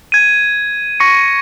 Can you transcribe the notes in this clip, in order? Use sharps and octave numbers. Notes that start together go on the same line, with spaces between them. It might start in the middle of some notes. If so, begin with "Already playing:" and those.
G#6 D#7
C#6 A#6 C#7